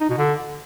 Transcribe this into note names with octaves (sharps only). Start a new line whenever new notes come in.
D#4
B2
D3